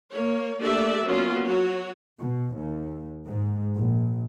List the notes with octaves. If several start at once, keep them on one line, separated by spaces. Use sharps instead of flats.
A#3 C#5
A3 A#3 D4 G4 D5 E5
F#3 A#3 B3 C#4 F4 F#4
F#3 F#4 C#5
B2
D#2
G#2
A#1